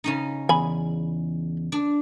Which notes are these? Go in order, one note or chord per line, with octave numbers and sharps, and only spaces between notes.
C#3 C#4 D#4
E2 G#5 B5
D4